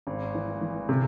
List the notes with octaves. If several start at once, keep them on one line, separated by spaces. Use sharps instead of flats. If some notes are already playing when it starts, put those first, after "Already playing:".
G#1
E3
E3
C3